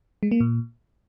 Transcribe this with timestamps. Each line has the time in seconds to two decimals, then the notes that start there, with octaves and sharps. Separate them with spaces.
0.23 G#3
0.31 A#3
0.40 A#2